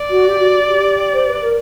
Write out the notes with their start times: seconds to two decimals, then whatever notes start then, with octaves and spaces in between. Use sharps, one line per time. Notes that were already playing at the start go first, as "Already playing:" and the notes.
Already playing: D5
0.09 F#4
0.28 G4
0.39 F#4
0.68 G4
1.13 C5
1.27 B4
1.42 A#4